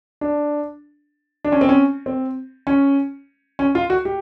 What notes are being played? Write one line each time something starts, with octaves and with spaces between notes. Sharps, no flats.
D4
D4
C#4
C4
C#4
C4
C#4
C#4
F4
F#4
G4